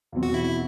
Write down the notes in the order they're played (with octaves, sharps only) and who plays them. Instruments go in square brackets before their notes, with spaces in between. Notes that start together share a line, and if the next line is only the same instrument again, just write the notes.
[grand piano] E2 B2 F#3 C4
[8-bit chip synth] F#4
E4
E4